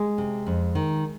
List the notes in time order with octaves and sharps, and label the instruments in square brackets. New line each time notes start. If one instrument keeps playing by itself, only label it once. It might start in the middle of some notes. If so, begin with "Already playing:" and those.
Already playing: [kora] G#3
[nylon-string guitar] C3
F2
D#3